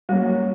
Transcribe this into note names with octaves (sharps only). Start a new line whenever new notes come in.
F#3 G3 A#3 C#4 F#4
G3